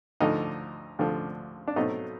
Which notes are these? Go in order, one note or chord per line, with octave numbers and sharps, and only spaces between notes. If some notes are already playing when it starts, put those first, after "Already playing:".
D2 D3 F3 D#4
D2 D3 F3
D4
B2 F#3 A3 C4 D#4